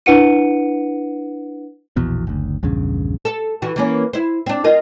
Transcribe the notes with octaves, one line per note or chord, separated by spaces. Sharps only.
D4 E4 B4 F#5 C#7 D#7
A#1 E2 B2
F#1 D2
A#1 E2 G2 C#3
A4
E3 F#4
E3 A#3 C#4
E4 C5
C4 D4
F4 A#4 D#5